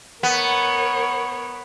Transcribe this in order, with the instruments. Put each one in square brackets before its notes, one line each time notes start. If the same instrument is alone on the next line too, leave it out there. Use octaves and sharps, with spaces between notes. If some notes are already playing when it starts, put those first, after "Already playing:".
[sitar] B3 [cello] A#4 C#5